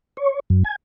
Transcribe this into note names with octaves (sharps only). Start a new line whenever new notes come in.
C#5
F#2
G#5